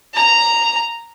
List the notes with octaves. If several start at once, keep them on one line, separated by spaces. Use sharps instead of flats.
A#5